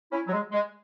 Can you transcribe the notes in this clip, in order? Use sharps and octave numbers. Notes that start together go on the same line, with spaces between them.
C#4 E4
F#3
G#3
G#3